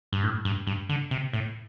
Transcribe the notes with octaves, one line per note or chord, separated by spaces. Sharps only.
G2
A2
G2
G2
D3
C3
A2